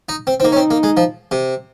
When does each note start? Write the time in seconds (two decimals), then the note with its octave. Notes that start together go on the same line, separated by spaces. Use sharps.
0.09 D#4
0.27 C4
0.40 C4
0.43 A#3 D#4
0.52 C#4
0.56 C4
0.71 A#3
0.83 G#3
0.97 F3
1.31 C3